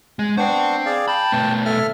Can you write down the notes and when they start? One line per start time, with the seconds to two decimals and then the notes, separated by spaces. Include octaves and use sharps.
0.19 G#3
0.37 B3 D4 C5 G5 C#6
0.86 G#4 D5 F5
1.08 G5 A5 B5
1.32 B2 A3
1.66 A4 E5 F6